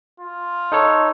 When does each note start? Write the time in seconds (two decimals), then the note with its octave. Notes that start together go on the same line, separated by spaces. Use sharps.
0.20 F4
0.72 D#4 A4 C#5